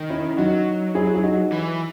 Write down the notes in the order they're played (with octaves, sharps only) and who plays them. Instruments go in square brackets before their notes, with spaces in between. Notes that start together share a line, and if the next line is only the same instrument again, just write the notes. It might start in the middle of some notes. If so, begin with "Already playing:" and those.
Already playing: [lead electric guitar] D#3
[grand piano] C#4 E4
[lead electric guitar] F#3 [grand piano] D#4 F#4
[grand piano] E4 G#4
G#4
D#4 F#4
[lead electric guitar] E3